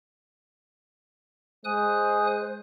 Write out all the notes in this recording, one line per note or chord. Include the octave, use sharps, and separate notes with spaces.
G#3 C5 G#5 D#6 F#6